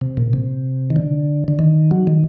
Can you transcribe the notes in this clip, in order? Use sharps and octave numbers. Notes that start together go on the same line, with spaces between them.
C3
A#2
C3
D#3
D3
D3
D#3
F#3
D#3